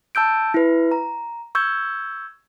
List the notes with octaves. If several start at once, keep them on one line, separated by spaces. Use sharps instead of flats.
A5 E6 G6 D7
E4 B4
A#5
C#6 E6 G6 G#6